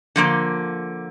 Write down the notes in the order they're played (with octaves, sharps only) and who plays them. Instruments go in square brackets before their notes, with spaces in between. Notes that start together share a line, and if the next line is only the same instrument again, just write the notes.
[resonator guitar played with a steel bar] D3 F3 A#3